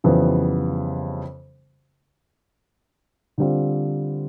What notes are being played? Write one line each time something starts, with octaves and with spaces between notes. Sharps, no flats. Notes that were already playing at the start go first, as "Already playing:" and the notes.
F2 C#3 E3 G3 B3
D3 G3 C4 F4